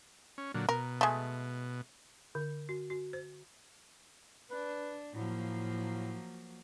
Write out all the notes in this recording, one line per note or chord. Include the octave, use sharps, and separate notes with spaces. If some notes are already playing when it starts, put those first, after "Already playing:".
C#4
A#2 D3 F#3
B2 A#4
G#3 A3
D3
F#4
F#4
C5
D4 B4
A2 F3 F#3 A#3